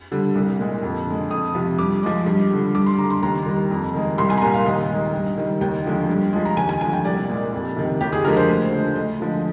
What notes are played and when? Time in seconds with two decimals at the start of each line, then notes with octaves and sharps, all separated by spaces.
0.12 D3 G3
0.35 C2
0.59 A#2 G#3
0.83 F2
1.07 D3 G#3
1.30 F2 D#6
1.55 C3 F3
1.79 G2 D6
2.03 F3 G#3
2.26 G2
2.50 D3 G3
2.75 G2 D6
2.86 C6
2.98 D3 G3 A#5
3.10 C6
3.22 D#2 A#5
3.46 D#3 G3
3.71 F2
3.94 D#3 G#3
4.18 C2 C6
4.30 G#5
4.38 A#5
4.42 A#2 G3 G#5
4.54 F5
4.66 D#2 D#5
4.90 D#3 G#3
5.13 G2
5.37 D#3 G3
5.61 D#2 G5
5.86 D3 F3 G#3
6.09 G2
6.33 F3 G#3
6.45 A#5
6.57 D#2 G#5
6.69 G#5
6.81 D3 F3 G#3 G#5
6.93 G5
7.05 C2 D5
7.29 A#2 G#3
7.53 F2
7.76 C3 D#3
8.01 D#2 G4
8.12 G#4
8.24 D3 F3 G#3 A#4
8.37 C5
8.48 D2
8.72 D3 G#3
8.96 D2 D#5
9.20 D3 F3 G#3